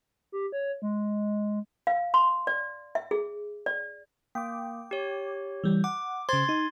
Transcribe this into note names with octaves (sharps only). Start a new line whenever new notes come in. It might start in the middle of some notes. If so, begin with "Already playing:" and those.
G4
C#5
G#3
F5
C6
D5
E5
G#4
D5
A#3 G5 D6
G4 C#5
E3 G3
F#5 D6
C#3 C5 C6 G#6 A6
D#4